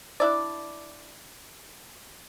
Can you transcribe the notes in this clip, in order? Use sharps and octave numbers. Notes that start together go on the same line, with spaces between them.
D4 E4 D5